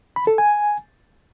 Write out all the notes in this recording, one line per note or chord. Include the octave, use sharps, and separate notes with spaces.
B5
A4
G#5